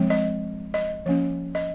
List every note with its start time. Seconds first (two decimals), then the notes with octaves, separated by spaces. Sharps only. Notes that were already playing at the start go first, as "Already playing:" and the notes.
Already playing: F3 G#3 C4
0.10 D#5
0.74 D#5
1.06 F3 A#3 C#4
1.55 D#5